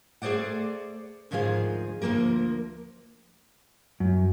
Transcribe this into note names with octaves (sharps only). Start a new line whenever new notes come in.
A3 G#4 A4 C5 D5 F#5
D2 G#2 D#3 F3 G#4 F5
D2 F3 A3 A#3 A#4
F#2